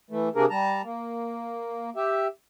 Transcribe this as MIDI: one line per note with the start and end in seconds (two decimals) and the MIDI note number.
0.11 0.29 52
0.11 0.29 57
0.35 0.45 48
0.35 0.45 58
0.35 0.45 62
0.35 0.45 68
0.35 0.45 70
0.50 0.82 55
0.50 0.82 81
0.50 0.82 82
0.84 1.90 58
1.96 2.27 67
1.96 2.27 76